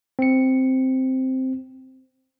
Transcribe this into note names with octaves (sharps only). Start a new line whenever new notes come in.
C4 C#7